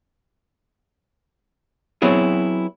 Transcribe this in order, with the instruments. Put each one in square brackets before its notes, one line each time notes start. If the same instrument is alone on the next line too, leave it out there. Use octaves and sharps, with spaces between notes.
[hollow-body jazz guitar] F#3 B3 C4 E4 G#4